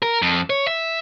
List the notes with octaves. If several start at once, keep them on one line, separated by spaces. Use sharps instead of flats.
A#4
F2
C#5
E5